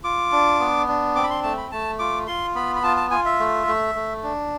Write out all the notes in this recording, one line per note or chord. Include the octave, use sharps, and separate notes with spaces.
F4 D6
D4
B3
D4
C4 D6
B5
C6
A3 A5
B5
A3 A5
F4 D6
F4 C6
B3 B5
B5
F4 A5
A5
F4 G#5
E5
A3
A3
A3
D4